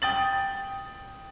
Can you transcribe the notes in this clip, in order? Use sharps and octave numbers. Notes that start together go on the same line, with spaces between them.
G5 D#6 A6 F#7